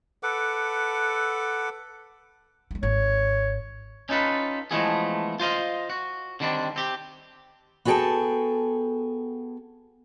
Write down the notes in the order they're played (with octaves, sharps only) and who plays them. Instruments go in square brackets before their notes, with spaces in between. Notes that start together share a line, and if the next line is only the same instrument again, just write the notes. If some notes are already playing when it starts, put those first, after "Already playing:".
[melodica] A4 B4 F#5 D6
[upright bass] F#3 G#3
[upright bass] G#1 [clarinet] C#5
[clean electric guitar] C#4 D#4 F4 A4 B4
E3 F3 G#3 A3 B3 G#4
F4 C5 D#5 F5
F#4
D3 D#3 G3 C4 D4
C4 G4
[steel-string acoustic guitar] B3 F#4 G#4 A4 G5 A5